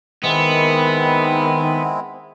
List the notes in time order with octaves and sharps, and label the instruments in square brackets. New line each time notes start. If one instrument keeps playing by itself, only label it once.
[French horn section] D#3 [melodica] G#3 C4 E4 [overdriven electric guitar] B3